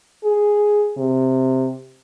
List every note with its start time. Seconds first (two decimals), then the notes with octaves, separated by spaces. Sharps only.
0.24 G#4
0.97 C3